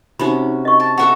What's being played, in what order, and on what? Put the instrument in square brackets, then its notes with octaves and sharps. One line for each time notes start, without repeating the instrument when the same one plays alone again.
[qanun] C3 C#4 F#4 [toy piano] D#4 B5
[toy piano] D#5 C#6
[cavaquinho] A5
[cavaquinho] F#4 F#5 [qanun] A4 E5 A#5